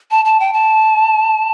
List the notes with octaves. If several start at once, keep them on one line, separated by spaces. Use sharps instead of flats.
A5
A5
G5
A5